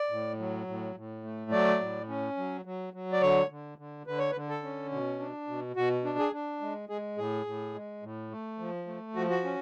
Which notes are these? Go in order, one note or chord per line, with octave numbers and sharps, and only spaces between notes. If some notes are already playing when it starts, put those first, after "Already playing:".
Already playing: D5
A2
F#3
A2
A2
A3
F#3 D5
A2
C#4
F#3
F#3
F#3
D5
D3 C#5
D3
D3
D3 B4
C#5
B4
D3
A4
C#4
B2
D4
B2
B2 F#4
D4
G#4
D4
G#3
G#3 G#4
A2 G#4
A2
G#3
A2
A3
F3
A3
F3 F#4
F#4
C#4